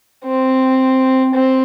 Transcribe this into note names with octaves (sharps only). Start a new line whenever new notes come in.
C4
C4